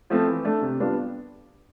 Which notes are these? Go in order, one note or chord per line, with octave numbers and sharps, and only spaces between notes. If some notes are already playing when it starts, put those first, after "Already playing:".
F3 A3 C4
E3
A3 D4
C3
G3 B3 D4 F4